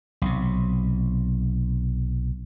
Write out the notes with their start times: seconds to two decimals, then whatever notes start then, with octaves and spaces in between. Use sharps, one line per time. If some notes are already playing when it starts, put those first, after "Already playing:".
0.22 B1 C3